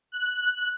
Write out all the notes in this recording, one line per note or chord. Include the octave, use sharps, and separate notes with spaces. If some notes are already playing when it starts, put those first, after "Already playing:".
F#6